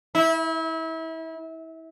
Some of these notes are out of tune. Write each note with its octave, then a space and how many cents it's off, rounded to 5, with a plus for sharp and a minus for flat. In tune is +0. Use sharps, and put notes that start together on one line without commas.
E4 -30